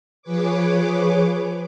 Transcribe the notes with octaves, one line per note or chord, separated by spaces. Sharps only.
F3 G#4 B4 C#5 D6